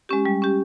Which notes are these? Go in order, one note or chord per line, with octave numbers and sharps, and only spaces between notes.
G#3 C#4 G4
G3
C#4 G4